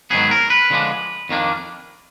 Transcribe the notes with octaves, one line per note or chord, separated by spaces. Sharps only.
G#2 D#3 F#3 B3 G#4
A#4
B4
D3 F3 G#3 D4
F2 D#3 A#3 D4